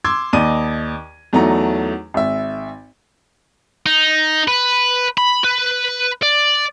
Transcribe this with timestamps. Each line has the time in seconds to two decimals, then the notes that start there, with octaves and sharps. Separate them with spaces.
0.04 C6 D6 E6 G#6
0.33 D#2 D5 D#5 D6 D#7
1.33 E2 F#3 A3 D#4 A#5
2.14 G#1 E5
3.86 D#4
4.48 B4
5.18 B5
5.44 B4
6.23 D5